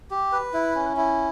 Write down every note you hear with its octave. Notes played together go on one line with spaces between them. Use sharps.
G4
B4
E4
C#4
E4